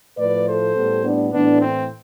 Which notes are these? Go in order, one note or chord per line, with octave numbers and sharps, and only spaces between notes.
A2 F3 A3 B4 D5
A4 C5
A2 G3 B3
B3 D4
A2 E3 A3 B3 D4
C4